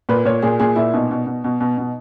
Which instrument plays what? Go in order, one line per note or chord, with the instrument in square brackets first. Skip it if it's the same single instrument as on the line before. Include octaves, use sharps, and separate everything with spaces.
[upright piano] A#2 B4
A#2 C#5
A#2 G#4
A#2 G#4
A#2 E4
B2 D#4
B2
B2
B2
B2
B2